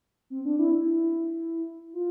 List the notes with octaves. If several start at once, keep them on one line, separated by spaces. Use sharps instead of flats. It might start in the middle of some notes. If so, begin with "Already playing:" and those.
C4
D4
E4
E4
F4